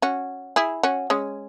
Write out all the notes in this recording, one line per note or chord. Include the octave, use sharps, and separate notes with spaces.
C#4 F#4
E4 G#4
C#4 F#4
G#3 C#4